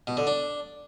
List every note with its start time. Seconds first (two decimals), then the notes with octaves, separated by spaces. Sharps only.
0.07 B2
0.17 D3
0.27 D4